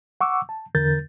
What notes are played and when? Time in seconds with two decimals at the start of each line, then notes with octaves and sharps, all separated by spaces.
0.21 F#5 C#6 D6 E6
0.49 A5
0.75 E2 D3 A#4 G6 A6